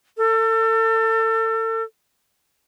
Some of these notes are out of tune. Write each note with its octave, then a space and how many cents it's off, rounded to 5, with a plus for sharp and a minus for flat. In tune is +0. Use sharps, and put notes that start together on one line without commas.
A4 +30